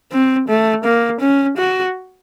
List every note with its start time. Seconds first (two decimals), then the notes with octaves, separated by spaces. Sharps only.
0.11 C4
0.48 A3
0.84 A#3
1.21 C#4
1.58 F#4